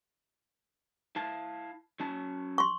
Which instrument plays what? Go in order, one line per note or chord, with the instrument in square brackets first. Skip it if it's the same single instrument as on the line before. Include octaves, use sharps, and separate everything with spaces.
[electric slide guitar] E4 F5 A5
F#3 C#4 A5
[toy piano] C6 C#6